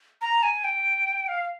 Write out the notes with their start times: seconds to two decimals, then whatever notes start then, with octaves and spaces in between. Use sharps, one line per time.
0.21 A#5
0.43 G#5
0.64 G5
1.28 F5